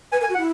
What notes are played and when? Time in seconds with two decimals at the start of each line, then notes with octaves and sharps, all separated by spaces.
0.12 B4 G#5
0.21 A#4
0.23 G#5
0.29 F#4
0.35 F#5
0.38 E4